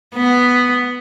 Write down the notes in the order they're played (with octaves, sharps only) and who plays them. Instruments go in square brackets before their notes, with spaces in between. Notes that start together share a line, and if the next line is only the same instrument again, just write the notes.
[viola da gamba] B3